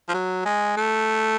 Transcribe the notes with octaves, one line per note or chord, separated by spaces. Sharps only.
F3
F#3
G#3
A3